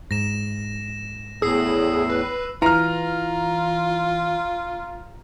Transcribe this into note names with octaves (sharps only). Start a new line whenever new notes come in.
G#2 A#6 E7
E2 A2 G#4 E6 C7
B4
E3 F4 A#5 F6